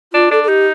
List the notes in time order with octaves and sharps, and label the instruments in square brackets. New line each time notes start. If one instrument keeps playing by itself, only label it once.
[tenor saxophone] D4 [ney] F4
[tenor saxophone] D4 [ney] A4
[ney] A4
[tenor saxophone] D#4 [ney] G4